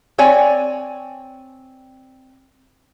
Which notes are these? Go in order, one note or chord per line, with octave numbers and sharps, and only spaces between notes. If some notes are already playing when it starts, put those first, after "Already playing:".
C4 C#5 D5 G#5